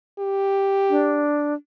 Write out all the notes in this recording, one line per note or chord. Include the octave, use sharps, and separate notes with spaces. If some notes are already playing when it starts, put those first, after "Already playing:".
G4
D4